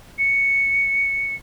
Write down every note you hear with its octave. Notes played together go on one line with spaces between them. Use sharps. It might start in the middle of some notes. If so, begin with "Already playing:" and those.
C#7